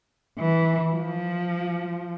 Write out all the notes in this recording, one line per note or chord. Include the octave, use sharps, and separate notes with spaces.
E3
F3